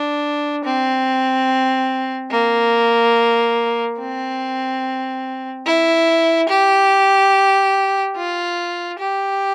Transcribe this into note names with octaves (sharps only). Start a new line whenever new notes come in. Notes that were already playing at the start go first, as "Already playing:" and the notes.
Already playing: D4
C4
A#3
C4
E4
G4
F4
G4